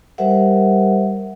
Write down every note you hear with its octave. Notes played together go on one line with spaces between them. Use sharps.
G3 G4 A#4 C5 E5 F#5